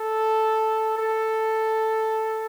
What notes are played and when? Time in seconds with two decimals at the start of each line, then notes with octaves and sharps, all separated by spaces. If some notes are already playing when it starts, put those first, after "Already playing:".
Already playing: A4
0.97 A4